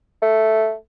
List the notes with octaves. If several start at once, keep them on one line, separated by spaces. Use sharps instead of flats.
A3